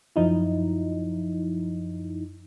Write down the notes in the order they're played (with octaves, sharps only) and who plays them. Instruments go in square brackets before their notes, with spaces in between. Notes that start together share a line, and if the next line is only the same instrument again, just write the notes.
[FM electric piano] F#2 F3 D#4 E4